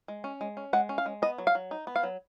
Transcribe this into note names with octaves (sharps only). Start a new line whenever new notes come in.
G#3
C#4
G#3
C#4
G#3 F#5
C#4
F5
G#3
B3 D#5
F#3
F5
F#3
D#4
B3
F5
F#3